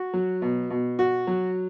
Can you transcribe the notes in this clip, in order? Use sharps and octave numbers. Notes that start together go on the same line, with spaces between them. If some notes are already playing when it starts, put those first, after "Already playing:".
Already playing: F#4
F#3
B2
B2
F#4
F#3